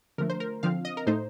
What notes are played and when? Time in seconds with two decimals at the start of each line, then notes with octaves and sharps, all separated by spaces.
0.18 D3 F3 A3 A#4
0.30 C5
0.40 A#4
0.63 D3 F3 C4 F5
0.85 D#5
0.97 A#4
1.07 A2 A3 D#4 C5